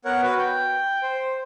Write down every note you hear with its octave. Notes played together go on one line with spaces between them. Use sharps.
B3 A#4 C#5 F#5
F#4 B4
G5
C5